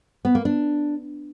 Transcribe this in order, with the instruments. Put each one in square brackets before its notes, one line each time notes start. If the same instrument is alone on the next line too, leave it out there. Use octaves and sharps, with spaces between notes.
[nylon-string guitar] B3
A#3
D4